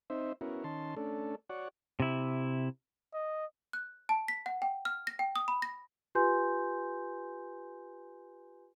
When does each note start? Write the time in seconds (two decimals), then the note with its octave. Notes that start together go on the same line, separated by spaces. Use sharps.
0.10 C4 D#4 C5 E5
0.41 B3 C#4 E4 F#4 A#4
0.64 D#3 C#4 A5 C6
0.96 A3 C#4 D4 A4
1.50 F#4 C#5 D5 F#5
2.00 C3 E4
3.13 D#5
3.73 F#6
4.09 A5
4.28 B6
4.46 F#5
4.62 G5
4.85 F6
5.07 A#6
5.19 G5
5.36 D#6
5.48 B5
5.62 A#6
6.15 F4 G4 B4 G#5 C6 G6